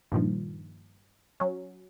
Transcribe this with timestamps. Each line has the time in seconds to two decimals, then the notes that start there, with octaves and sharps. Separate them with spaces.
0.12 G2 A#2 D#3 F3
1.40 F#3 C#4